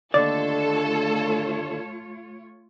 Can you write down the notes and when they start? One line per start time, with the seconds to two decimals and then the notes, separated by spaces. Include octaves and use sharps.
0.14 D#2 D3 A3 D4 F4 A4 C#5 D5